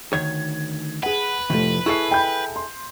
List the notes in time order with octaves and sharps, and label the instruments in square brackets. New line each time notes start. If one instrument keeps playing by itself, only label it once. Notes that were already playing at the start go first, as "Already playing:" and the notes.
[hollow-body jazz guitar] D2 D#3 C#5 [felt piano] G#6
[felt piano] G#4 F#5 [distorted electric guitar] B4
[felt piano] F1 A3 [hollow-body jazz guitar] A2 F3
[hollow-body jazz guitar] E4 G#4 A4 [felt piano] C#6 C7
[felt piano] G5 B5 G6
C6